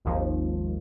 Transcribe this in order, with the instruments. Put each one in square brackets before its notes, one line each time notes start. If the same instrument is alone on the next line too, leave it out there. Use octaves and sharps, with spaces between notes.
[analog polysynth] G#1 D#2 F3